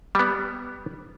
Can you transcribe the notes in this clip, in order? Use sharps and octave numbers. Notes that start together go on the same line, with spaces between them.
G3 B3